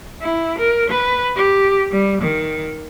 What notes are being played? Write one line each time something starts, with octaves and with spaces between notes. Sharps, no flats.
E4
A#4
B4
G4
G3
D#3